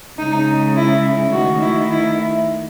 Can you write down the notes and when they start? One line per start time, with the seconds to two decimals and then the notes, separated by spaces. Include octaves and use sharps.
0.19 C#3 G#3 D#4
0.76 E4
1.33 D#3 A3 F#4
1.62 E4
1.90 E4